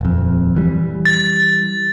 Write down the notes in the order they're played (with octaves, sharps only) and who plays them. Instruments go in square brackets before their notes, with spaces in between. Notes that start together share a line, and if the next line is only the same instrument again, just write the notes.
[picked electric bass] D#1 F2
E3 G3
[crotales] A6